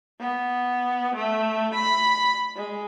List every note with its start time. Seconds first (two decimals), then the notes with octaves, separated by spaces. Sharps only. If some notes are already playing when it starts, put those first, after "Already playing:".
0.20 B3
1.15 A3
1.74 B5
2.56 G#3